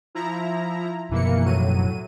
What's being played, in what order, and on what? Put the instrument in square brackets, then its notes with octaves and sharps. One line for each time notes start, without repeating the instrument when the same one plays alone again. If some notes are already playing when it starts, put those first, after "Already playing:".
[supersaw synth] F3 E4 A#5
[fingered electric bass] F#2 B2 F3 [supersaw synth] E3 A#3 C#7
[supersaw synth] A2 F#3 D#7